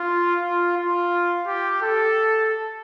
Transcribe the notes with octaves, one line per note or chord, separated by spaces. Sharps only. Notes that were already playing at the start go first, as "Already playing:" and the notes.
Already playing: F4
F4
F4
G4
A4